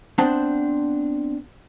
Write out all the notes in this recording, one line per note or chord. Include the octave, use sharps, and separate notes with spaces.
B3 C4 D4 C5 F#5 A5